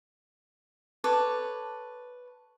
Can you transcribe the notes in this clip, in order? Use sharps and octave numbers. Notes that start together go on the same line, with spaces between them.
A4 B4 C#5 D6